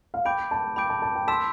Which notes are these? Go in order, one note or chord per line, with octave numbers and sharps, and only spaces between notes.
F5
G5 B5 D6 G6 D7
A5
G5 B5 D6 G6 D7
A5
A5
G5
A5 C6 E6 B6 E7